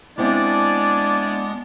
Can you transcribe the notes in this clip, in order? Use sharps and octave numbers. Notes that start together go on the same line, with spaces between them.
G#3 B3 C4 D4 E4 D5 G#5